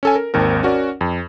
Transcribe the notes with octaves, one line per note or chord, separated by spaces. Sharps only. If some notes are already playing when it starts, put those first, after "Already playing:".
C#4 A4 G#5
A#4
G#1 D#2 C4 A#4
C#4 F#4 A#4 D5
F2